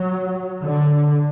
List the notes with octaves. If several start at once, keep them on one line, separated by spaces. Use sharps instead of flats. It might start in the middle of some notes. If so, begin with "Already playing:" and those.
Already playing: F#3
D3